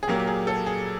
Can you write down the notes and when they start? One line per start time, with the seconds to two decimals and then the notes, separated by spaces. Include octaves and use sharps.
0.03 G#4
0.08 A#2 F#3 A#3 G4
0.20 G4
0.27 G#4
0.47 A4
0.66 G#4